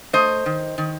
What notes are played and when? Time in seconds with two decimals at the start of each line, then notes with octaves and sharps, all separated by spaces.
0.13 A3 C5 D#5
0.46 D#3
0.78 D#3